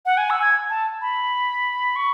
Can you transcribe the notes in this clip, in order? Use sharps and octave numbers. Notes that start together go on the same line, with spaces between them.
F#5
G#5
E6
G#6
A5
B5
C#6